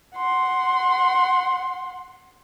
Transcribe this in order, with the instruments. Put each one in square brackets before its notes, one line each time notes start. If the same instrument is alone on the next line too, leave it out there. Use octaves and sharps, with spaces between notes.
[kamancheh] F#5 C6